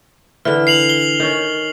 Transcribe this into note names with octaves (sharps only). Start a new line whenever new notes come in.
D3 E3 F6
C7 F7 F#7
G7
D#3 C#4